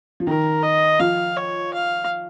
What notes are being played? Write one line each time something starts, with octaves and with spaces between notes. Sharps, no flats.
F3
D#3 A#4
D#5
F3 F5
C#5
F5